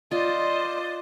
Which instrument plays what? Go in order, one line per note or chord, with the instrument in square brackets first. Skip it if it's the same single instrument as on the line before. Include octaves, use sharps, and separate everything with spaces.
[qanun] F4 [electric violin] C5 D#5 [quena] D5